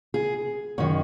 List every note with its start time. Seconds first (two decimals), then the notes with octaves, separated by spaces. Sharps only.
0.14 G#4
0.78 F#2 D#3 C#5